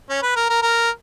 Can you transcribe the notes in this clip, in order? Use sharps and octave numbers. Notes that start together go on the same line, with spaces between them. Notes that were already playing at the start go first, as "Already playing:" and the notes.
C#4
B4
A#4
A#4
A#4